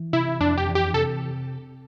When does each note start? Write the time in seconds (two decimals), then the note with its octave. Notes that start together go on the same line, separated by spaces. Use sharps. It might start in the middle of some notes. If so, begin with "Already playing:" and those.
Already playing: E3
0.13 C3 E4
0.40 F2 D4
0.58 G4
0.67 E3
0.75 G4
0.94 C3 A4